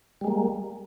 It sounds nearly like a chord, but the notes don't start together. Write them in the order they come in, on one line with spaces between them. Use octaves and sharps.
G3 G#3 A#3